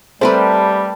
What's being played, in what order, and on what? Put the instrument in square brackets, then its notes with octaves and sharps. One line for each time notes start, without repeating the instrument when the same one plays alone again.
[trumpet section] G3 [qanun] A3 A#4 B4 [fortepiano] C4 [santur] G5 A5